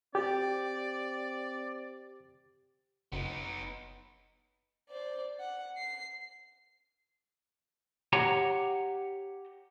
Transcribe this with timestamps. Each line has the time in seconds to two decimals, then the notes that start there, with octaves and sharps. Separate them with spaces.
0.15 C4 G4 D5
3.12 F#1 B3 D#4
4.89 C5 D5
5.40 F#5
5.77 C7
8.13 G4 C#5 F#5 A#5